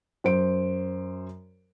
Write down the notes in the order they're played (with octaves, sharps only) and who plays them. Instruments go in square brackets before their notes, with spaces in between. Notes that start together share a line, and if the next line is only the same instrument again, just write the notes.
[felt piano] F#2 C5 D7